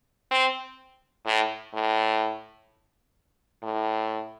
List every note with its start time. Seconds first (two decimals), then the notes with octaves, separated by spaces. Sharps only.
0.31 C4
1.26 A2
1.73 A2
3.62 A2